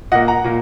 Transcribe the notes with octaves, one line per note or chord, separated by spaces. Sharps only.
A#2 A#3 D#5 F#5
F#5 A#5
A#2 A#3